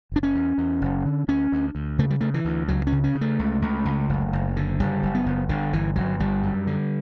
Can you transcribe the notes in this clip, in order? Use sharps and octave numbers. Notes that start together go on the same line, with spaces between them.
F#1 D4
C#4
E2
E2
F#1
D3
D2 C#4
D2
D2
C#3 A3
G3
C#3 A3
E3
D2
C#2 F#3
C#4
C#3
C#4
C#3
A3
C#2
C#2
C#2
F#1
F#1
D3
F#1 G3
F#1
B3
F#1
G1 D3
G1 E3
G1 F#3
G1 G3
F#2
D3